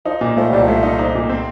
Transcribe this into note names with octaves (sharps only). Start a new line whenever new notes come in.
F3 D#4
A#2
F3 A3
C2 G3
F3
A3
D#4
D#4
A#2
C4